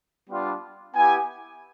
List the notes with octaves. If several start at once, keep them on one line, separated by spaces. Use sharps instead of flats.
G3 B3 D4 F4
B3 E4 G4 G#5